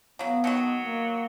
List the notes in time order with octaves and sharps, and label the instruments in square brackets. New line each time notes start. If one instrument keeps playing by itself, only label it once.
[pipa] C#3 F#3 [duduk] B3
[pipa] B2 D#3 F#4 [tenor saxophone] F#3
[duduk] A#3